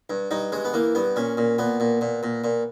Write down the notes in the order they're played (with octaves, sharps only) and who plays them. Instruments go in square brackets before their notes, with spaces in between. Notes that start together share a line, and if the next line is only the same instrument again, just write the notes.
[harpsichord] G2
G2 D#4
G2 G#3
B3
E3 A#3
G2 B3
A#2 C#4
A#2
A#2 B3
A#2
A#2
A#2
A#2